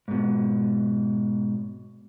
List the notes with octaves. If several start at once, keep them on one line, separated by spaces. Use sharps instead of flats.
G#2 B2